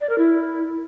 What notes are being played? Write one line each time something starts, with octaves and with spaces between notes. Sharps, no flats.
D5
A#4
E4